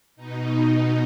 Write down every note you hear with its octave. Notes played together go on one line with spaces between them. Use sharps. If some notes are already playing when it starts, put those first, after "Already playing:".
B2 D#4